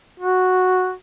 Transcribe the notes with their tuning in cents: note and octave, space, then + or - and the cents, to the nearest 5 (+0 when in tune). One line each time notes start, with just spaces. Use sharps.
F#4 -5